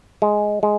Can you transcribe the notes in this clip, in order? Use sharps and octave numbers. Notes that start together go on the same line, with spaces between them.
G#3
G#3